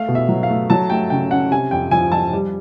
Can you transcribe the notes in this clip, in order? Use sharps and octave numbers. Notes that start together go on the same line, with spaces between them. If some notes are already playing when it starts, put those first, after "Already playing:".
Already playing: A3 F5
B2
E5
F#3
F5
A3
F#3 A5
A3 G5
C#3 G5
C#4 F#5
C3 G#5
F2 G5
F3 G#5
F3 A5
G3